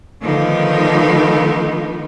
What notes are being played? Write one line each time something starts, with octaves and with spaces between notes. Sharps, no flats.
D3 D#3 F3 A3 B3 D#4